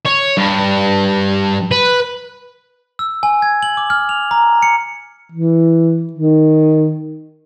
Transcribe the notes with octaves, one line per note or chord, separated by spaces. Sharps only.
C#5
G2
B4
E6
G#5
G#6
F#7
D6
F6
F7
A#5
C#7
E3
D#3